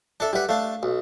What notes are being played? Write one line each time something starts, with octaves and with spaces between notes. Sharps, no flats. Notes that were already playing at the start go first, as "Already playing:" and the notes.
D4 A4 D5 E5
G3 G4 B4 E5 F#5
A3 D4 F5
B1